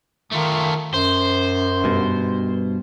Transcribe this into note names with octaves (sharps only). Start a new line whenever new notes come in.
D#3 A3 F4
F#2 C5
G2 B2